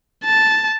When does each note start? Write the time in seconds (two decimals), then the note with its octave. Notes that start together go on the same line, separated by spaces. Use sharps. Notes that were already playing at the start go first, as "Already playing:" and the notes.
0.24 A5